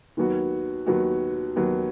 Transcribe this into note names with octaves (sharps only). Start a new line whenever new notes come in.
D#2 D#3 F#3 B3 F#4
D#2 D#3 F#3 B3 F#4
D#2 D#3 F#3 B3 F#4